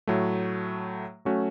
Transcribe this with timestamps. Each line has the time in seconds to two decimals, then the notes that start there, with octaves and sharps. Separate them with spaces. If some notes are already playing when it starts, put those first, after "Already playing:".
0.07 A2 F#3 A3
1.25 F#3 A3 C#4 F#4